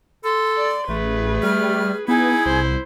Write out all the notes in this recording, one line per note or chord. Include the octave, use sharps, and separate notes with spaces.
A4 C6
D5
A1 A3 G#4 B4
G3 F6
B3 D#4 E4 G#4
C2 C5